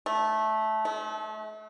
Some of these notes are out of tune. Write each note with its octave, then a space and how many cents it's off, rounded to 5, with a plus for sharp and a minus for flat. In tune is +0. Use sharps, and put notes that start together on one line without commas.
A3 -15
A3 -40